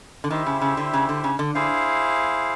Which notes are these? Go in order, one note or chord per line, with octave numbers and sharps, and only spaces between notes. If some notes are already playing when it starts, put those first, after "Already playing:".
D3
D#3 E4 G4 C5 E5
C#3
C#3
D3
C#3
D3
C#3
D3
D3 E4 G#4 C5 F5